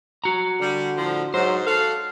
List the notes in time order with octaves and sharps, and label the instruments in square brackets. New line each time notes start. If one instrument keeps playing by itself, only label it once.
[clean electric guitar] F#4 A#5
[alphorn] D3 [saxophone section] G3
[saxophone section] A2 F3
[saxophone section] G#2 [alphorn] F#3 [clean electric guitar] C5
[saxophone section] F#4 F5 [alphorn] A4